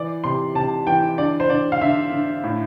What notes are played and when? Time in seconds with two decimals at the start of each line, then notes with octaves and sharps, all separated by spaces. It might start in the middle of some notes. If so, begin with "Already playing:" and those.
Already playing: E3 D5
0.24 C3 C6
0.55 C3 A5
0.87 E3 G5
1.18 D3 D5
1.40 C5
1.49 D3 D5
1.72 F5
1.81 D3 E5
2.13 D3
2.44 A2